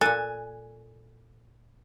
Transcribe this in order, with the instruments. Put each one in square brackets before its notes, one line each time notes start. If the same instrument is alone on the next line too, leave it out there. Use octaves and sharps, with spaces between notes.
[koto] A#2 A4 [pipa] G#5 [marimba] F#6